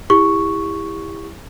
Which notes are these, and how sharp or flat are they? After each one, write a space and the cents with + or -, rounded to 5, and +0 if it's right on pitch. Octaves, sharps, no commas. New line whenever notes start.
E4 +0 G4 +35 C#6 +0